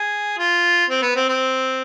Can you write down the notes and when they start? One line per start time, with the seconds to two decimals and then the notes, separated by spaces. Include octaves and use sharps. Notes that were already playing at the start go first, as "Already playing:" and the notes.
Already playing: G#4
0.38 F4
0.90 C4
1.02 B3
1.16 C4
1.29 C4